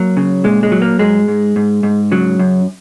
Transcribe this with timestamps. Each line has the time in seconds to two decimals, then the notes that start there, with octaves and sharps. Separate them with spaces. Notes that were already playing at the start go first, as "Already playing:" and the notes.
Already playing: F#3 A#3
0.17 C#3
0.44 A#2 G#3
0.63 G#3
0.72 F#3
0.82 A#3
0.99 G#2 G#3
1.28 G#2
1.56 G#2
1.83 G#2
2.12 C#3 F#3
2.39 F#2